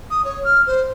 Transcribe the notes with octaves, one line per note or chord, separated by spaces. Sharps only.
D#6
C#5
F6
C5